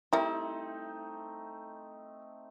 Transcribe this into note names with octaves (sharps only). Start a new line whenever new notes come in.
G3 A3 C4 D#4 E4 A#4